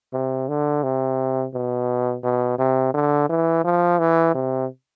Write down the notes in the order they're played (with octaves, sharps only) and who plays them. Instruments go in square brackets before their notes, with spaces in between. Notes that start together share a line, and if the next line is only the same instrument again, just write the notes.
[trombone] C3
D3
C3
B2
B2
C3
D3
E3
F3
E3
C3